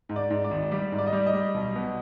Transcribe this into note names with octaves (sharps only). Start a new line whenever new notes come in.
G#2
D5
G#2
D5
G#1
G3 D5
G#2
D5
D#5
G3 D5
D#5
G3
B1
B2